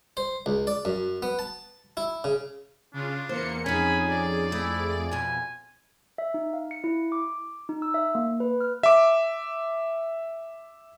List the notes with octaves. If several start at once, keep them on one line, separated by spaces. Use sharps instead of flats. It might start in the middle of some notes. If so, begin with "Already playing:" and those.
C5
C#2
D5
F#2
B3
A5
E4
C#3
C#3 D4 F4
E2 A#3 C5 C#7
F2 C#4 D#4 G#4 G#5 B5
D5
A3 E4
F2 B2 G#5
E5
D#4
F5
C#7
E4
D6
D#4
E6
E5
A#3
B4
F6
E5 D6